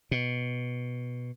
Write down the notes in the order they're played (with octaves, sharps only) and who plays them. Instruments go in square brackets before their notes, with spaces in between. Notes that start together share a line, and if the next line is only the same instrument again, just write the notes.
[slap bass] B2